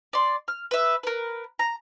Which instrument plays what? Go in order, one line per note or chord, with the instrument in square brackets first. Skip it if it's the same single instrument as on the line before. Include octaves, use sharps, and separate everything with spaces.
[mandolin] D5 C6
F6
B4 E5
A#4 B4
A#5